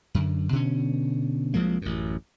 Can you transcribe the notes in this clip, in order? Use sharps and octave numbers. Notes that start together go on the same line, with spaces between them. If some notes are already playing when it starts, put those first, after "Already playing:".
F#2 D3
B2 D3 C#4
C2 F3 G#3 A#3
A1 F#2